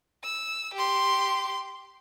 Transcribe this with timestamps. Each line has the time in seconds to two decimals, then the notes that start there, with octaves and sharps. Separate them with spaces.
0.24 E6
0.74 G4 C6